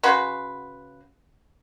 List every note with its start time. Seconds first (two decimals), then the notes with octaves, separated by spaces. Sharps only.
0.03 C#3 F#4 B4 C6